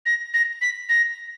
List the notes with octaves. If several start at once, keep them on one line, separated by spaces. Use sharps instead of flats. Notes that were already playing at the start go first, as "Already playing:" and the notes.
A#6
A#6
B6
A#6